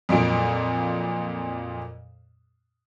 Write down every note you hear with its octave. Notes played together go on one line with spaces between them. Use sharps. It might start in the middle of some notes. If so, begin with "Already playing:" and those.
F2 A#2 F#3 D7